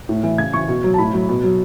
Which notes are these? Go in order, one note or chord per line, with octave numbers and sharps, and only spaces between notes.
A2
E3
C#3 G#6
E3 C#6
B2
F#3
A5
A2 B5
F#3
B2
F#3